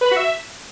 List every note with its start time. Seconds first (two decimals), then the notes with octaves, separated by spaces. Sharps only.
0.01 B4
0.06 B5
0.11 F#4
0.16 E5